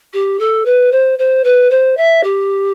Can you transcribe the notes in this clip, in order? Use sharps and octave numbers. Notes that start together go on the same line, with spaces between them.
G4
A4
B4
C5
C5
B4
C5
E5
G4